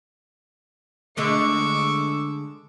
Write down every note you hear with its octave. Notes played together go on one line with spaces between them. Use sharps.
D3 G#3 A3 C#6 D6 E6